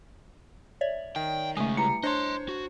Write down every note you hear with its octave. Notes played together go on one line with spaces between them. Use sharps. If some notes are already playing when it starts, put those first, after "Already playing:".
C#5 D5 E5
D#3 G5
C#3 G#3 A3 G#5 D#6
G3 E4 B4 A#5 C#7
D4 C5 C#5 D#5 C6
F#4